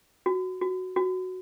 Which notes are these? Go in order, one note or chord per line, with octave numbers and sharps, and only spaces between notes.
F#4
F#4
F#4